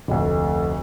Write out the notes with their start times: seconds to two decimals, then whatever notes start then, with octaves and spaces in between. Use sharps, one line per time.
0.08 F1 D2